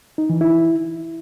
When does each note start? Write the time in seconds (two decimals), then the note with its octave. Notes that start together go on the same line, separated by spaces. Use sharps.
0.18 D#4
0.30 E3
0.41 E4